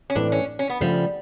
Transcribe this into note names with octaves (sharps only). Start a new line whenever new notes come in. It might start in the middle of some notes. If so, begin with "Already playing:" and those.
C#4
A2 E3 A3 C4 D4
C#4
C#4
B3
C#3 F3 G3 A3